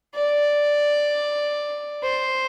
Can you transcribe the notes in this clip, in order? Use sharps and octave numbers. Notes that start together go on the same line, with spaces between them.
D5
C5